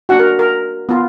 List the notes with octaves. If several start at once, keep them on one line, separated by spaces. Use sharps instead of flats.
A#3 D4 F#4 F#5
A#4
A#4
B3 F4